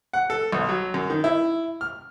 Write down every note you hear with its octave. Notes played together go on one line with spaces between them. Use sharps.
F#5
A4
B1
F#3
F#2
D#3
E4
F6